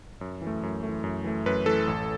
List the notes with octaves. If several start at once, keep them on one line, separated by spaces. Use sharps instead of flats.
F#2
E3
A3
F#2
A3
E3
F#2
E3 A3
F#2 B4
E3 A3 A4
A1